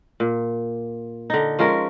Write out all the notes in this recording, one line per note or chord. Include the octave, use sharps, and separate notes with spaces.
A#2
D3 D#4
F3 G#3 C#4 A#4